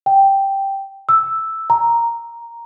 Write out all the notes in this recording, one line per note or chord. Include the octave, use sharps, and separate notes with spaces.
G5
E6
A#5